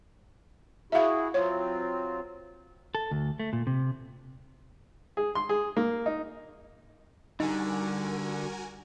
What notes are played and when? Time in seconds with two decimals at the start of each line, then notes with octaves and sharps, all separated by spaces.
0.92 E4 F#4 G#4 E5 F5
1.34 F#3 C4 F4 C#5
2.95 A4
3.11 D2
3.40 A3
3.53 A#2
3.67 C3
5.17 G#4
5.35 C6
5.49 G#4
5.77 A#3
6.06 D#4
7.40 D3 G3 D#4 F#4 A#4 G#5